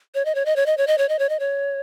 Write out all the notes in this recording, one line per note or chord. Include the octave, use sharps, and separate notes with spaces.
C#5
D#5
C#5
D#5
C#5
D#5
C#5
D#5
C#5
D#5
C#5
D#5
C#5